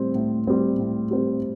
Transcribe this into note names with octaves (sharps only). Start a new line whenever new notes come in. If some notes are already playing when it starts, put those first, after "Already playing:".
Already playing: A2 G3 C4
A2
G3 C4
A2
G3 C4